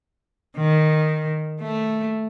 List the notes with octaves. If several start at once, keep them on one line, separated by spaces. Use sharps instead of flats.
D#3
A3